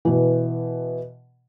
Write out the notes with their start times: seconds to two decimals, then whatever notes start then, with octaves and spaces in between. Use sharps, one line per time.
0.05 B2 E3